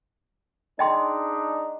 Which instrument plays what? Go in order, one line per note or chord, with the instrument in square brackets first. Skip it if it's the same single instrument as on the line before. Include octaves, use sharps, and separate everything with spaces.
[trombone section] G#3 D4 D#4 [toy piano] D#5 G5 C6